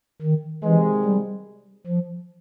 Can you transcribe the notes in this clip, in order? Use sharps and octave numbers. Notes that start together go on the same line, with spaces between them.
D#3
C3 D#3 E3 G#3
G3
F3